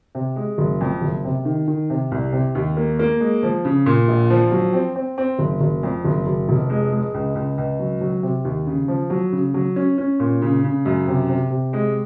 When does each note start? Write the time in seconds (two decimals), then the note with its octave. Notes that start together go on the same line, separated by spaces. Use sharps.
0.15 C3
0.36 G#3
0.58 F#1
0.81 F2
1.01 F#1
1.24 C3
1.45 D#3
1.67 D#3
1.90 C3
2.11 C2
2.33 C3
2.55 D#2
2.77 A#3
2.99 A#3
3.20 G#3
3.43 F3
3.65 C#3
3.86 A#2
4.08 A#1
4.30 F3
4.51 F#3
4.73 C4
4.96 C4
5.18 C4
5.39 F#1
5.61 F#1
5.83 F2
6.05 F#1
6.26 F#1
6.49 F1
6.70 G#3
6.92 G#3
7.14 C#2
7.35 C#2
7.58 C#2
7.79 F#3
8.01 F#3
8.23 C3
8.45 D#2
8.67 C#3
8.88 F3
9.10 F#3
9.32 C#3
9.54 F#3
9.76 C#4
9.98 C#4
10.20 A#2
10.42 C#3
10.64 C#3
10.86 F#2
11.07 C3
11.29 C3
11.50 C3
11.73 G#3